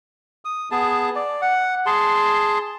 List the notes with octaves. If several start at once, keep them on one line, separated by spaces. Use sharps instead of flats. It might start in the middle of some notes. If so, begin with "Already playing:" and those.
D#6
B3 G#4 A5
D5
F#5
G#4 A5 C6